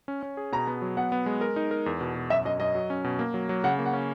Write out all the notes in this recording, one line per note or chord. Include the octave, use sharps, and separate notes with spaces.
C#4
C#4
G#4
B2 A#5
B3
F#3
B3 F#5
B3
G#3
A#4
D#4
A#4
E2
B2
B2
F#2 E5
F#2 D#5
F#2 D#5
F#3
C#4
B2
A#3
F#3
F#3
C#3 F#5
A#3
F#5
C#4